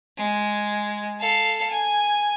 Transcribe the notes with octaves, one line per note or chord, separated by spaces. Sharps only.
G#3
A4 F5
G#5